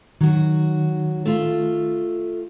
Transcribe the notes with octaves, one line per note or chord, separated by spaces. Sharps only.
D#3 F#3 F#4
A3 F4